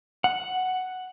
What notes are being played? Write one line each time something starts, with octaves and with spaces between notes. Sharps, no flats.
F#5